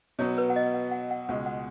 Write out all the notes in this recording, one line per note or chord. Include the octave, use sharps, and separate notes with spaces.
B2 F#3 B3 C#5
B4
F#5
D#5
F#5
F#5
F#5
C#2 B2 G#3 F#5
F#5